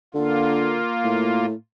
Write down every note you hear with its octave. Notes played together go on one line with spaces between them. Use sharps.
D3 A#3 F4
A2